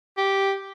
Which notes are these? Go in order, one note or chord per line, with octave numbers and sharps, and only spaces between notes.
G4